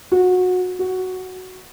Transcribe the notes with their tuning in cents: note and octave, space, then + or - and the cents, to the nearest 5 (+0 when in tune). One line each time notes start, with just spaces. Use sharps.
F#4 -20
F#4 +5